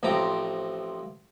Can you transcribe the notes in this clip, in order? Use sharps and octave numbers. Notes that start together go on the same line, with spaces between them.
A1 A2 F3 C4 A#5 D6